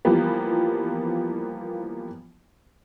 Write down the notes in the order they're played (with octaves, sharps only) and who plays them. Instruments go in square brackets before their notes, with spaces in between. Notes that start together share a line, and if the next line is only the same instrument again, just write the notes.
[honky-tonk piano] E3 F3 G3 A#3 B3